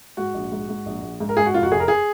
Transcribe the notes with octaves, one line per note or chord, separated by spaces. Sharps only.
G#2 F#4
A#1
G#2
G#2
A#1
A#1
G#2
A#4
G#2 G#4
F#4
F1 F4
F#4
F1 G#4
A#4
G#4